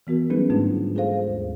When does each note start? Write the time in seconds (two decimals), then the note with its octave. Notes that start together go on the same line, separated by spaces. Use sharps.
0.07 E3 B3 F#4 A#4
0.30 F#3 G3 C#4 D#4 G#4 B4
0.50 G#2 D3 G#3 A3 D4 F4
0.95 F4 G#4 A4 C5 F5
1.28 D#2